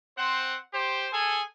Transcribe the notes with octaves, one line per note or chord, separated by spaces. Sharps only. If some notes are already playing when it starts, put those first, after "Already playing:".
C4 C5 F#5
G4 C5
G#4 A4 G#5